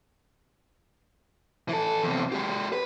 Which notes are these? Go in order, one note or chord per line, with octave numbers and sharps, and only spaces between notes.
E3 A4
E2 C3
G#3 G4
B4